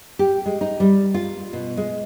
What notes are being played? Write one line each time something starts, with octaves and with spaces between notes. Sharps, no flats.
G4
G#3
D#4
G3
F4
B2
G#3